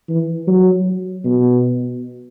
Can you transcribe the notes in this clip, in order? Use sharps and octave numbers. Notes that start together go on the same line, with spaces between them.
E3
F#3
B2